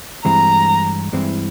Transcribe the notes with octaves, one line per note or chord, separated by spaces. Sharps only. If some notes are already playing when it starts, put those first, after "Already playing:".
G2 E3 G#3 C4 E4 A#5
G2 E3 G#3 C4 E4